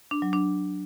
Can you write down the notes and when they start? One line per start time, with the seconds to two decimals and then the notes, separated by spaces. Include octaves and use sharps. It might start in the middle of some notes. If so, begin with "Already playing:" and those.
0.11 D4
0.22 F#3
0.33 D4